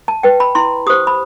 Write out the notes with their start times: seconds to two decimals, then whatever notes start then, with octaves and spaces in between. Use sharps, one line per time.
0.08 A5
0.23 B4 G5
0.40 B5
0.55 E4 C6
0.86 G4 C5 D#6
1.07 B5